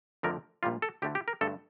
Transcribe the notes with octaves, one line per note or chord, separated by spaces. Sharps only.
F2 D3 F3 A3 A#4
A#1 A#2 G3 A#3 F4
A4
D2 D3 A3 G4
G4
A#4
G2 D3 A3 A4